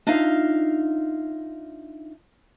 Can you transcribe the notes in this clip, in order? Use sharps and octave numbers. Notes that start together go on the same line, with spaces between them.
D4 D#4 F4 E5 F5